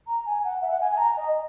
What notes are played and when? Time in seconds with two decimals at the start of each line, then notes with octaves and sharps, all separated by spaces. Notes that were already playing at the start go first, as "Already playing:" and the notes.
0.07 A#5
0.26 G#5
0.44 F#5
0.62 E5
0.71 F#5
0.81 G#5
0.91 G#5
0.98 A#5
1.17 D#5